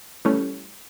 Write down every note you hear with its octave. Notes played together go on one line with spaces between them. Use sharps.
E3 G3 A3 C#4